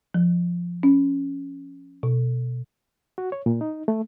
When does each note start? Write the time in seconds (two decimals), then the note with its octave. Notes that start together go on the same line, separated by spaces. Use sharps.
0.14 F3
0.83 C#4
2.03 B2
3.18 F#4
3.32 C#5
3.46 A#2
3.61 D#4
3.88 A3